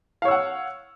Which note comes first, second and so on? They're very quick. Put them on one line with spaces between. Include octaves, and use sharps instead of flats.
F5 C#5 E6 F#5